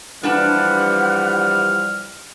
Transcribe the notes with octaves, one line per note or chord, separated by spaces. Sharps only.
E3 F3 G3 D4 B4 F#5 A5 F6